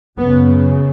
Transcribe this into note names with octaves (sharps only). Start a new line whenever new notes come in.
F#2 C#3 B3